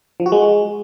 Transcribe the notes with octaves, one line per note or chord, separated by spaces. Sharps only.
F3
F#4
G#3